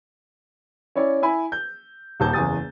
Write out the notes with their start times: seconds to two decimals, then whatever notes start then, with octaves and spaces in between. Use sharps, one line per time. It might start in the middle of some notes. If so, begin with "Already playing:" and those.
0.96 C#4 E4 C#5 D5
1.23 E4 G#5 B5
1.52 G6
2.20 D#1 D#2 A5 G6
2.33 F#1 E2 G#5 D#6 A6